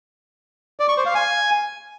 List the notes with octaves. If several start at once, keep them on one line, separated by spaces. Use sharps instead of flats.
D5
C#6
C5
F5
G#5